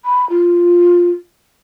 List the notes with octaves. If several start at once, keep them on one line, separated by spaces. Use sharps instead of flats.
B5
F4